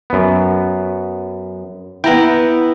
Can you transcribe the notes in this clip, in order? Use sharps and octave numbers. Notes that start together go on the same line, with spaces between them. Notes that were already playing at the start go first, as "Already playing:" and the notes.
F#2 B3
B3 E4 G5 A#5